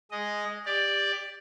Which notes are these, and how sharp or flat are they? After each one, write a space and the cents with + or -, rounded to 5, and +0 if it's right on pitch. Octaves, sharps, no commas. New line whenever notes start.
G#3 +0 D#5 +0
G4 +25 D5 +0